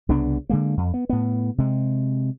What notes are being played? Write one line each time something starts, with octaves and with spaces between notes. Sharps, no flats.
C2 C#3 B3 D4
D3 G#3 A#3
F2
B3
A2 B3
C3 G#3